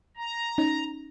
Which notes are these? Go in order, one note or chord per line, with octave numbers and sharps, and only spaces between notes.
A#5
C#4 D#4